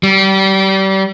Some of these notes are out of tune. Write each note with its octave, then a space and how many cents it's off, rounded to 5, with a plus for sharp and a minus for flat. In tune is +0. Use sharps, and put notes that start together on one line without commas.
G3 -30